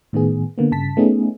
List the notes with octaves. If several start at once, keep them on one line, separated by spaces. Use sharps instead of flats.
A2 D#3 B3 G#4
D3 A#3 B3
G2 C#3 A5 B6
A3 B3 C#4 D#4 G#4